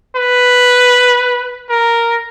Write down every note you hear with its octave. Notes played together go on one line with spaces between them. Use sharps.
B4
A#4